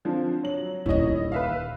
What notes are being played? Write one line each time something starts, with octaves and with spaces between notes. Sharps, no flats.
D3 F3 C4
F#3 F#7
D#1 D#3 E4 C#5 D#5
B4 E5 F5